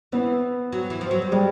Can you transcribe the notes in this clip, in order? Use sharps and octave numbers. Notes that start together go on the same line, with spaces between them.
E3 B3
F#3
E3
F3
F#3
G3
G3 G#3